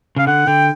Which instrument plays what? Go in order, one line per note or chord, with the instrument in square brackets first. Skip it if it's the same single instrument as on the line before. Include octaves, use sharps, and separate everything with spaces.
[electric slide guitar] C#3 [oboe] F5
[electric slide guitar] D3 [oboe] F#5
[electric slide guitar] D3 [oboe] G5